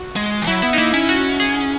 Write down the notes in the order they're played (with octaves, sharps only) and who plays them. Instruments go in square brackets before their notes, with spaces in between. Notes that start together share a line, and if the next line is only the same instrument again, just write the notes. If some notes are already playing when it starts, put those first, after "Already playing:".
Already playing: [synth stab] F#4
[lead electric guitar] G#3
E3
[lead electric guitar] F#3 [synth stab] E4
[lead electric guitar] B3 [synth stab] E4
[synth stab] D#4
[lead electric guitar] A#3 [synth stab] E4
[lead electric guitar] C#4 [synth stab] E4
[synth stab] F#4
G#4